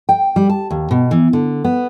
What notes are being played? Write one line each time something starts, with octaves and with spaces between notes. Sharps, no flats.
G5
G3
A5
D#2
B2
E3
D3
B3